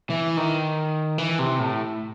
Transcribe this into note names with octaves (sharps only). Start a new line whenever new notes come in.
E3
D#3
E3
C3
A2